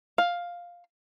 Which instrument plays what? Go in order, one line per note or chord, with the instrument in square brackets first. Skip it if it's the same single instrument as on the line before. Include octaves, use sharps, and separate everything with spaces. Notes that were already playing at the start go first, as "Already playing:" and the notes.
[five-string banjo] F5